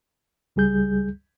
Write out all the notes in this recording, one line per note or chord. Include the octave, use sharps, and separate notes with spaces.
C#2 G3 G#4 G6